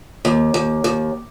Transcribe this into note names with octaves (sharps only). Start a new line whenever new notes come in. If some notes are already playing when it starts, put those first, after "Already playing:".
D#2
D#2
D#2